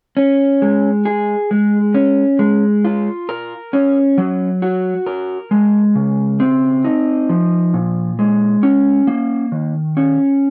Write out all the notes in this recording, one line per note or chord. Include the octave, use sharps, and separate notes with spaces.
C#4
G#3
G#4
G#3
C#4
G#3
F4
A#4
C#4
F#3
F#4
A#4
G#3
C#3
C4
D#4
F3
A#2
G#3
C#4
A#3
D#3
C#4